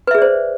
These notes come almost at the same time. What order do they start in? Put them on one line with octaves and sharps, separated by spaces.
B4 E5 G#4 D5 C5